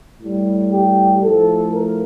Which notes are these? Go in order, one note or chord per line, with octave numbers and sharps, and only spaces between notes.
A2 G3
G4
A2 F3 A3 A4
A#4